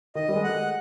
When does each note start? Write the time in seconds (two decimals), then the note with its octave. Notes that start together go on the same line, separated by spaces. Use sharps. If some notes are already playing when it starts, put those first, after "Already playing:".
0.15 D#3 D#5
0.29 G3
0.36 G#3
0.43 A3 F#5